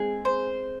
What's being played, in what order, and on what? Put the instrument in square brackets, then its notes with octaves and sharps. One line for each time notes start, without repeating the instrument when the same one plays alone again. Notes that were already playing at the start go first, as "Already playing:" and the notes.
Already playing: [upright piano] G#3 C4 [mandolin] G#4
[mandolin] C5